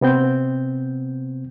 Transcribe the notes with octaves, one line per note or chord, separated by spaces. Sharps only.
C3 B3 C4 G6